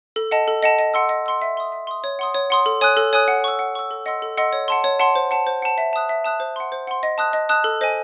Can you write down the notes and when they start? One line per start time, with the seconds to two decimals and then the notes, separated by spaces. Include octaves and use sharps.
0.16 A4
0.31 D#5 F#5 A5
0.48 A4
0.63 D#5 F#5 A5
0.79 D#5
0.94 F#5 C6 E6
1.09 D#5
1.26 F#5 C6 E6
1.42 E5
1.57 C6 D#6
1.72 E5
1.87 C6 D#6
2.04 C#5
2.19 F#5 C6 D#6
2.35 C#5
2.50 F#5 C6 D#6
2.66 A4
2.81 C#5 G#5 D#6 F#6
2.97 A4
3.13 C#5 G#5 D#6 F#6
3.28 F#5
3.44 C#6 E6
3.59 F#5
3.75 C#6 E6
3.91 A4
4.06 D#5 F#5 C6 E6
4.22 A4
4.37 D#5 F#5 C6 E6
4.53 C#5
4.68 F#5 A5 C6
4.84 C#5
4.99 F#5 A5 C6
5.15 C5
5.31 F#5 A5
5.47 C5
5.62 F#5 A5
5.78 E5
5.93 A5 D#6 F#6
6.09 E5
6.24 A5 D#6 F#6
6.40 C5
6.56 F#5 C6
6.72 C5
6.87 F#5 C6
7.03 D#5
7.18 A5 D#6 F#6
7.33 D#5
7.49 A5 D#6 F#6
7.64 A4
7.81 C5 D#5 G#5